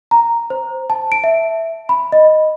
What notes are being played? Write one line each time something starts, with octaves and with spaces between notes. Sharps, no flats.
A#5
C5
A5
D7
E5
B5
D#5